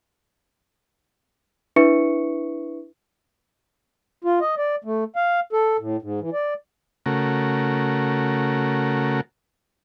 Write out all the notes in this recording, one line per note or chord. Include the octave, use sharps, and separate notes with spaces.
D4 E4 B4 E5 C#6 C#7
F4
D#5
D5
A3
F5
A4
A2
G#2
E3
D5
C#3 A3 F#4 A#4